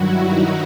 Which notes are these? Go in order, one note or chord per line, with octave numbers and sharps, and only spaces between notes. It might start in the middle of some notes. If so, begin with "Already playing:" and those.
Already playing: G2 D#3 F#3 E4 F#4
D#4